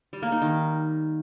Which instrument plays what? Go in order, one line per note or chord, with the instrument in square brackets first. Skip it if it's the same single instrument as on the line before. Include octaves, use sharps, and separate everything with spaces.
[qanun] G3
A#3
D#4
D#3